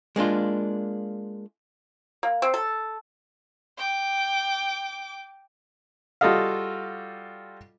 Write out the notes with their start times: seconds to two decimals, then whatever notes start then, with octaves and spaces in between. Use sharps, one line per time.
0.16 G#3 A#3 D4 F4
2.23 A#3
2.42 C4
2.54 A4
3.78 G5 D6
6.21 G3 F4 F#4 A4 D#5 F5